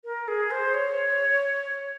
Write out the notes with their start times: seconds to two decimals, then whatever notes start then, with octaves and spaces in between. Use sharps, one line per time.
0.05 A#4
0.28 G#4
0.51 C5
0.74 C#5